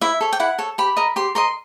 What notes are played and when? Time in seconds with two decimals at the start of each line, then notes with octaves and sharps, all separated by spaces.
0.01 E4 E5
0.21 A4 C#5
0.33 G5
0.40 E4 F#5
0.59 A4 C#5
0.78 G4 B5
0.97 A#4 D#5
1.16 G4 C6
1.35 A#4 D#5 C6